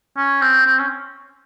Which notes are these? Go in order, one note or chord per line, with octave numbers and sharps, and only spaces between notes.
C#4
C4
C4
C#4